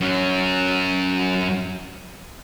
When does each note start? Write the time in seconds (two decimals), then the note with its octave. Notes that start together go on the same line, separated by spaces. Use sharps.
0.01 F#2 F#3